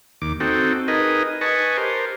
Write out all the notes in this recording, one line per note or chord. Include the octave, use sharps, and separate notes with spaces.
D#2 D6
C4 D#4 F#4 A4 G5
D#4 G#4 A#4 B4 D#5
B4 D#5 G#5 A5 C#6
G4 A#4 C5